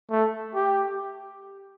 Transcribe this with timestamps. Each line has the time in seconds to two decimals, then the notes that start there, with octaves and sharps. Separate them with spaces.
0.11 A3
0.55 G4